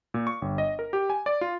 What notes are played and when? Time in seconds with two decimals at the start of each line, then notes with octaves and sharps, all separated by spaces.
0.14 A#2
0.27 C#6
0.42 G1
0.58 D#5
0.79 A#4
0.93 G4
1.10 G#5
1.26 D5
1.41 F4